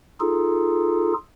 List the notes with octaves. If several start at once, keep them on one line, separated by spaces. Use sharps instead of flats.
D#4 F4 G#4 A4